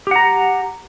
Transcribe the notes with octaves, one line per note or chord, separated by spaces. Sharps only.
G4 F#5 A#5